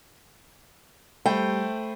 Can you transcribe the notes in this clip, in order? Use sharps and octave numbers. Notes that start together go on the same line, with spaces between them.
G3 A3 C5 G5 B5